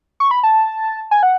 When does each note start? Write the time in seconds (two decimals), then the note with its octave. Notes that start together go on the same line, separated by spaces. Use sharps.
0.20 C#6
0.31 B5
0.43 A5
1.11 G#5
1.23 F#5